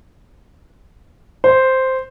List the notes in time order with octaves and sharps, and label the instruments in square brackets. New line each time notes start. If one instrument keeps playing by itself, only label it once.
[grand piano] C5